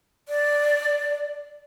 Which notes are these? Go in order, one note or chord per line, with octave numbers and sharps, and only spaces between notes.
D5